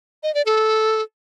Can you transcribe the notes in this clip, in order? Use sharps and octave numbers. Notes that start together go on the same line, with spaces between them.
D#5
D5
A4